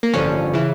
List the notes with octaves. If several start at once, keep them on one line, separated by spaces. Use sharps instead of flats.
A#3
A1 G2 D3 F3 C#4
C#3 E3